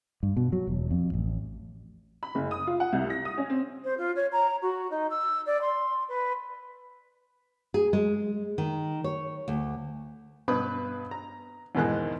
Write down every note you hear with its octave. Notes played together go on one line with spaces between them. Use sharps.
G2
B2
F#3
E1
F2
A1
B5
F#1
D#6
F4
F#5
C2
A#6
D#6
C#4
C4
C5
F4
C#5
A#5
F#4
D#4
E6
D5
C6
B4
G#4
G#3
D#3
C#5
D2
G2 B2 B4 B5 D#6
A#5
E2 G#2 B2 D#3 G#3 F#6